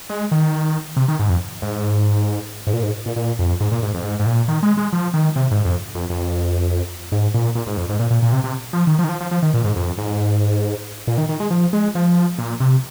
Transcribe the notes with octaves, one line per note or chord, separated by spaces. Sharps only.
G#3
D#3
C3
D#3
G#2
F2
G#2
G#2
A#2
G#2
A#2
A#2
F2
G#2
A#2
G#2
F2
G#2
G#2
A#2
D#3
G#3
G#3
F3
D#3
C3
G#2
F2
F2
F2
G#2
A#2
A#2
G#2
F2
G#2
A#2
A#2
A#2
C3
C3
F3
D#3
F3
D#3
F3
F3
F3
D#3
A#2
G#2
F2
G#2
A#2
D#3
D#3
G#3
F3
G#3
F3
A#2
C3